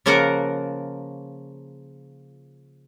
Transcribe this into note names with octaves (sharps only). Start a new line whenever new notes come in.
C#3 F3 A#3 F4 A#4 F#5